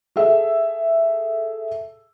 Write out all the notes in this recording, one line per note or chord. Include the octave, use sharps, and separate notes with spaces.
G#4 A4 E5